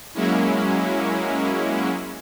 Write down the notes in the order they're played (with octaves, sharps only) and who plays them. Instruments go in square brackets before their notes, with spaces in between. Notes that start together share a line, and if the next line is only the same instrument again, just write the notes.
[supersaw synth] F#3 G#3 A#3 C#4 E4